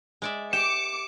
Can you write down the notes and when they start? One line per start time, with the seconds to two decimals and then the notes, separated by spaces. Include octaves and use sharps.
0.22 G#3 D5 E5
0.53 G4 D6 C#7 E7